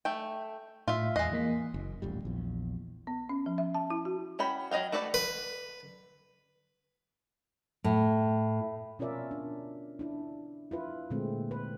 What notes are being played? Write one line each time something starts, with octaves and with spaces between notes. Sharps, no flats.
A3 G5
A2 F4 E5
E2 G#3 D#5 F#6 C7
E3 A#3 B6
F#1
D#1 A1 G3
A#1 E2
B3
C#4
F3
E5
A5
E4
F#4
C#4 F#4 G5 B5
F#3 D#5 F5 G5
A3 F#4 A4 B4 D5
B4
A2
B2 C#4 F4 A#4 D5 E5
D4
D4 E4
E4 F4 B4
A#2 D3 G#3 A3 C4
B4